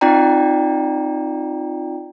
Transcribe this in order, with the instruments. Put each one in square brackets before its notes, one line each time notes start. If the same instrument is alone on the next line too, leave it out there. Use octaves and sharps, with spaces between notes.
[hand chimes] C4 D#4 F4 D5 G5 A#5